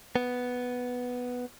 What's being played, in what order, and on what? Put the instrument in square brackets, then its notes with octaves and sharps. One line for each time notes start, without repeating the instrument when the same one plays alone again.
[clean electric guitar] B3